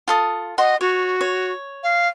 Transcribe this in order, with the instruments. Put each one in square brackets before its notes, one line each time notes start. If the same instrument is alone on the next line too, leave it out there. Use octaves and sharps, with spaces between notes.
[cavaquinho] F4 A4 D#6
[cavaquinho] F#4 C6 [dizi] D#5
[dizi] F#4 [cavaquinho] C#5
[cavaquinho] C#5
[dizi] F5